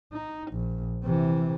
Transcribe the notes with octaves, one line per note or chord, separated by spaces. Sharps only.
D#4
A#1
C3 E3